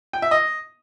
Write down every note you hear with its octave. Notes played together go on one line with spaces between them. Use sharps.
G5
E5
D#5